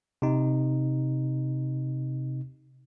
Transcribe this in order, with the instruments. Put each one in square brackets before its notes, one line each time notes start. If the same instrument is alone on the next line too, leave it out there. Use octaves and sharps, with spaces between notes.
[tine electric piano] C3 D#4